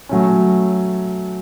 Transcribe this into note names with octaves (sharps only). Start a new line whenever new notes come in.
F#3 A3 C#4